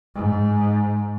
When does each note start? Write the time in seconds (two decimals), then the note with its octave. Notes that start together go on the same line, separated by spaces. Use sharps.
0.15 G#2